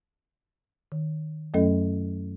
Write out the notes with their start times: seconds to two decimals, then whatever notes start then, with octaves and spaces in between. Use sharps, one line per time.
0.92 D#3
1.54 F#2 F#3 A3 C#4 A4 D#5